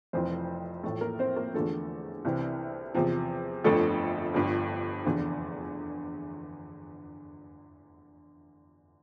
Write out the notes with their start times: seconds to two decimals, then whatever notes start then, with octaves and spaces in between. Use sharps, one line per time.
0.13 F1 F2 E3 C4 C5
0.83 A1 A2 F3 A3 A4
1.01 A#3 A#4
1.19 C4 C5
1.36 A#3 A#4
1.54 E2 D3 F3 A3 A4
2.25 C2 C3 E3
2.95 E2 C3 F3
3.64 G1 F2 D3 F3 A3 A4
4.34 G1 G2 F3
5.06 F1 E2 D3